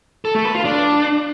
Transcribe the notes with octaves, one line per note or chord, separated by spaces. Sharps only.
A4
A3
B4
F4
D4